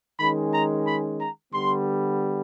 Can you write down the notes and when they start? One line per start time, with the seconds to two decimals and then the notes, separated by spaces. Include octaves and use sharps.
0.19 D#3 G#3 C#4 B5
0.53 A#5
0.86 B5
1.20 A#5
1.53 D3 G3 B3 C6